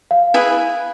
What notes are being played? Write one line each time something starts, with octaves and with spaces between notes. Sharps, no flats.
F5
E4 G#4 B4